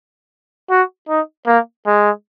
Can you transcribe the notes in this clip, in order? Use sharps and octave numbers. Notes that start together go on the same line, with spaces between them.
F#4
D#4
A#3
G#3